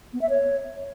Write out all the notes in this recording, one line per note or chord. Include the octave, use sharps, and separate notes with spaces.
B3
E5
C#5